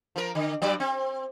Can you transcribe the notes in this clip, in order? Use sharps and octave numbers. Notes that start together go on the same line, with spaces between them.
F3 A#4
D3
G2 F#3 D5
C4